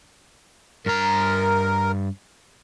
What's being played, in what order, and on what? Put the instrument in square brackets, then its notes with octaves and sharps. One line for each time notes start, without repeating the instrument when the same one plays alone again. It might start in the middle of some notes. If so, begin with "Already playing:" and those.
[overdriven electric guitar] G2 A#5 [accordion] A#4